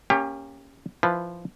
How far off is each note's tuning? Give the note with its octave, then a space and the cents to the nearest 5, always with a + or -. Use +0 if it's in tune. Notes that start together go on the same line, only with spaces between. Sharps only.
A#3 +0 C#4 -5 G4 +25
F3 -10 E4 -15 B4 +0